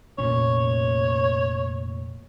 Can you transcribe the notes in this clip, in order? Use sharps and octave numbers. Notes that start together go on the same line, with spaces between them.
F1 A#2 C#4 C#5